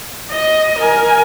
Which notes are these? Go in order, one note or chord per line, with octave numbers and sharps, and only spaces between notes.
D#5
A#4 G#5